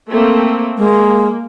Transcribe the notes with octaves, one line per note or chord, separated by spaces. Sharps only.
A3 A#3 C4
G#3 A#3